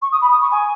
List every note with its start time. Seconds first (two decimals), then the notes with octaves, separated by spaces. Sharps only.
0.02 C#6
0.12 D#6
0.21 B5
0.31 D#6
0.42 C#6
0.51 G#5